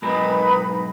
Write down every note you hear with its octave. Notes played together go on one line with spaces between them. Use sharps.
B1 G#2 D#4 A#4 B4 B5